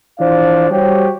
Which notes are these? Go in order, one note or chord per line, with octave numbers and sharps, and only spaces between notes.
E3 F3 D4 C5 F5
G3 F#4 G4 C5 C#5